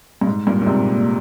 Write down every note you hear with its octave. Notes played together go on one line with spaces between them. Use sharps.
G2
G#2
G2 A#2
A#2
G#2 C3